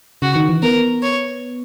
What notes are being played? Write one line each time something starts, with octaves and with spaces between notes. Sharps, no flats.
C#3 F#4
D#3
E3
B3 A#4
C#5